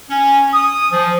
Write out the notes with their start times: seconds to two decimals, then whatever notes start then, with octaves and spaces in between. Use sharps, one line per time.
0.10 C#4
0.53 D#6
0.92 F3